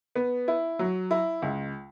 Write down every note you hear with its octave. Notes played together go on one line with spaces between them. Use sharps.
B3
E4
F#3
E4
C#2